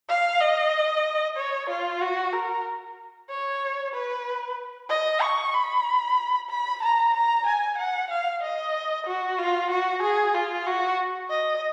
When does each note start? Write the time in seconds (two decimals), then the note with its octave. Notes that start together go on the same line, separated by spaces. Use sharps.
0.09 F5
0.41 D#5
1.37 C#5
1.69 F4
2.01 F#4
2.33 A#4
3.30 C#5
3.94 B4
4.90 D#5
5.22 C#6
5.54 B5
6.50 B5
6.83 A#5
7.14 A#5
7.46 G#5
7.78 F#5
8.10 F5
8.42 D#5
9.06 F#4
9.38 F4
9.71 F#4
10.03 G#4
10.35 F4
10.66 F#4
11.30 D#5